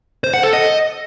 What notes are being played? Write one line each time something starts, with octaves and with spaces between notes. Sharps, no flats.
C5
F#5
A4
D#5